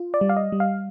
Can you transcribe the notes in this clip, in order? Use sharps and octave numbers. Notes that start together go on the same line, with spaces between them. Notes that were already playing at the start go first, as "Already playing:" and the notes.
Already playing: F4
D5
G3
F5
D#5
G3
F5